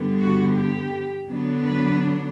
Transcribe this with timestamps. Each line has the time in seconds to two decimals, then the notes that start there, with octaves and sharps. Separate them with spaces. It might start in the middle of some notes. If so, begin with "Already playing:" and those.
Already playing: G2 D3 G3 B3
0.18 F#4
0.55 G4
1.30 D3 F#3 B3 D4
1.66 B4